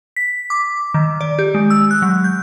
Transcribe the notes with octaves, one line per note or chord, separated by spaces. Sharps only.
B6
D6
D#3
D5
G4
G#3
E6
F#6
F#3
G6